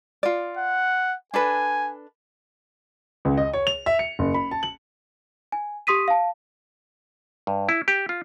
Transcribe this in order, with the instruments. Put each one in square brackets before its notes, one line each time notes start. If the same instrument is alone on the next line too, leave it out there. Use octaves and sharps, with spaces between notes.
[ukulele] F4 D5
[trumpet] F#5
[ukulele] D4 A4 B4 [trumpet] G#5
[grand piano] C#2
D#5
C#5
F7
E5
C#7
F#1
B5
A5
F#7
[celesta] G#5
G4 C6 D#6 B6 D#7
F5 A5
[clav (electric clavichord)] G2
E4
G4
F4